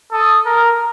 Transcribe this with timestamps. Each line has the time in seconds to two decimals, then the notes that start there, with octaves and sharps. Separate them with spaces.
0.12 A4 D#6
0.46 A#4